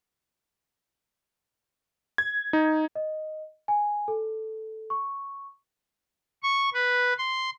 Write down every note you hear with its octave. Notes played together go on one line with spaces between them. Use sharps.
G#6
D#4
D#5
G#5
A4
C#6
C#6
B4
C6